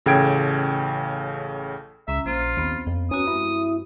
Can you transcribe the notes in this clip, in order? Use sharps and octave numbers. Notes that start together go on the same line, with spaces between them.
A1 C#3 A4 G5 G#6 D7
C#2 C#4 E5 A#5
A#1 F4 C5 A#5
D#2 B3 C4
F2 F3
C#4 F#4 B4 A#5 D#6
G2 G#3 E4